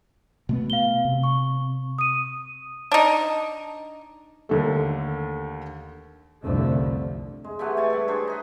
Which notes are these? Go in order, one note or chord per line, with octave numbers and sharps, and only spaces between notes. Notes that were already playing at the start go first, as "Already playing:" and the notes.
B2 A3 B3
F5 G7
C3
C#6
D#6 D#7
D4 D#4
D#2 D3 A3
G1 C2 F2 D3 A3
G#3
C3 E3 A3 F#5
D5 G#5 A5 C#6
G3 A4
D4 G#4 C5 C#5
D#4 G#4 B4